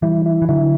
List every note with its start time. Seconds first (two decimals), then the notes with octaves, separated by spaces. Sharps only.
0.02 E3 G3 E4
0.26 E4
0.42 E3
0.49 D3 F#3 E4